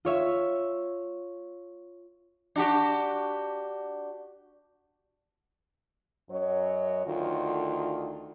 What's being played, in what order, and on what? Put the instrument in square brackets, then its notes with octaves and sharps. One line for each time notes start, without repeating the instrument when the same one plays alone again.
[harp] F4 C#5 E5
[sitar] D4 F#4 G4
[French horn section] F#2 F#3 C#5 D#5
D2 D#3 F4